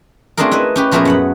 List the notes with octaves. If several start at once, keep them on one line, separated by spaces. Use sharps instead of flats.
A3 C4 D4 F4 G#4 A#4
E4 B4 D#5 E5
C#4 G4 B4
A#2 F3 A3 B3 G#4 A#4
F#2 F#5 B5